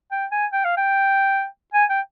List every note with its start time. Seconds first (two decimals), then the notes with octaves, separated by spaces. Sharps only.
0.11 G5
0.32 G#5
0.53 G5
0.64 F5
0.77 G5
1.74 G#5
1.90 G5